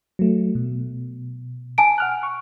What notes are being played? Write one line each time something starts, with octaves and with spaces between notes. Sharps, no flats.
F#3 A3
B2
G#5 A5 D7
F#5 F6 F#6
C#6